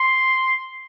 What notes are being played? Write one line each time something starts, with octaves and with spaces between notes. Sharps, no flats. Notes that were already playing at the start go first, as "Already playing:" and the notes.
Already playing: C6